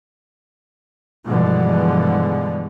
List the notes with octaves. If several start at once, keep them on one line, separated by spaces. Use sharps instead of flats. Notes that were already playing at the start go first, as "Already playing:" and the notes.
G2 B2 D3 E3 F3 G#3